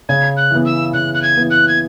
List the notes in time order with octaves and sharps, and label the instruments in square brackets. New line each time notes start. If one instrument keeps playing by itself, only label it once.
[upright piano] C#3 [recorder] G#6
[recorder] F#6
[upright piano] E3 B3
[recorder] E6
[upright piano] C#3 [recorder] F#6
[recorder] F#6
G#6
[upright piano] E3 B3
[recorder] F#6
G#6